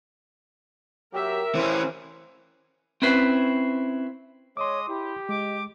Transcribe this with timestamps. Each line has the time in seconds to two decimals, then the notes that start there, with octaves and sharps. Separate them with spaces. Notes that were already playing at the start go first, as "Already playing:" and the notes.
1.13 F#3 G4 A#4 E5
1.55 E3 C#4 C5
3.02 C4 C#4 E4 B4 C5
4.57 G#3 C#5 D#5 C6 D6 D#6
4.88 E4 G4
5.29 G#3 D#5 D6